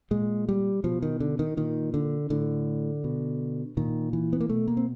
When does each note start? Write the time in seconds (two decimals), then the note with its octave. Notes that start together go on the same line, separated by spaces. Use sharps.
0.11 A#2 G#3
0.49 G3
0.84 B2 F3
1.02 D#3
1.20 D3
1.39 D#3
1.57 A#2 D#3
1.94 D3
2.30 A2 D3
3.04 B2
3.77 A#2 D#3
4.13 E3
4.33 B3
4.40 A#3
4.49 B2 A3
4.68 A#3
4.77 C4